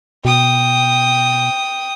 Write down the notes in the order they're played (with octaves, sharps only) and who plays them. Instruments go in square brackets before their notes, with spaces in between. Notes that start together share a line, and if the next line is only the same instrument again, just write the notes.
[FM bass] B2 [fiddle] G5 D#6